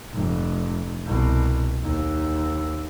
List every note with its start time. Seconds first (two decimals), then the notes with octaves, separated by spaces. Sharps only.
0.14 F1
1.05 C2 B2
1.82 D#2